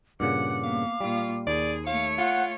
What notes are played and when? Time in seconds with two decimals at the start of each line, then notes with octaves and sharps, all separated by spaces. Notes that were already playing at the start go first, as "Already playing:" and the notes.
0.20 G2 A#2 C#3 F#5 D6
0.64 A#3 B3 F5
1.00 A#2 G3 F4
1.47 D#2 G#4 D5
1.86 A3 C#5 F5
2.18 F4 F#5